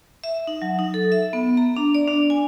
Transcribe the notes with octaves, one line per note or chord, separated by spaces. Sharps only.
E5
D#4
F#3
D#4
A4
E5
B3
A#5
D4
D5
D4
G#5